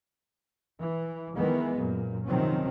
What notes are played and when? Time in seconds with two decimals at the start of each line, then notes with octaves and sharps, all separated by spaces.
0.80 E3
1.35 D#3 E3 G#3 B3
1.76 F#2 A#2
2.26 C3 D#3 F3 F#3 C4 C#4